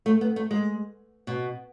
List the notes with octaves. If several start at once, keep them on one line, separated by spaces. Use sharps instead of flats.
A3
B3
A3
G#3
B2